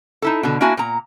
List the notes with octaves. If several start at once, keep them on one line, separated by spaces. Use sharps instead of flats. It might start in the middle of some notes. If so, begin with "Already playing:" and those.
D#4 E4 A4
B2 D3
A#3 D4 E4 F#4 G#5
A#2 A#5